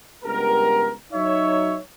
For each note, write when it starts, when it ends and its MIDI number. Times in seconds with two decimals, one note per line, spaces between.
0.24 0.92 37
0.24 0.92 43
0.24 0.92 59
0.24 0.92 67
0.24 0.92 70
1.13 1.78 54
1.13 1.78 63
1.13 1.78 73
1.13 1.78 76